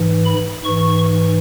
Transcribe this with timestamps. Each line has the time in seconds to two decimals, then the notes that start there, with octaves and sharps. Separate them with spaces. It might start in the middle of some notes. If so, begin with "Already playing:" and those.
Already playing: G#2 E3
0.25 B5
0.64 G#2 E3 C#6